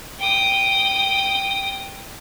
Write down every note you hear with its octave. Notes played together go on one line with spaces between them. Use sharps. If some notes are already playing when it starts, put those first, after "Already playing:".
G5 D#6